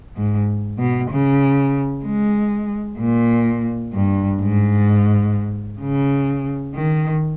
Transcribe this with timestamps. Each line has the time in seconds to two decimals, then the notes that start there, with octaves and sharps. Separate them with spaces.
0.16 G#2
0.79 B2
1.11 C#3
2.04 G#3
2.99 A#2
3.94 G2
4.41 G#2
5.82 C#3
6.75 D#3